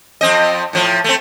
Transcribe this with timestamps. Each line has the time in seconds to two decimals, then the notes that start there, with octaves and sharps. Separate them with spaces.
0.21 F2 C4 D#5
0.73 A2 F3
1.04 A3 C4